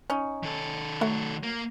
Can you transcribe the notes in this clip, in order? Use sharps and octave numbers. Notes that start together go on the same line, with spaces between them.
C#4 D#4
D#3 A4
F#3 A3
A#3